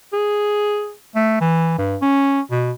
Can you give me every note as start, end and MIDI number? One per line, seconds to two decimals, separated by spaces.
0.13 0.93 68
1.15 1.37 57
1.41 1.76 52
1.78 1.96 43
2.01 2.41 61
2.51 2.72 47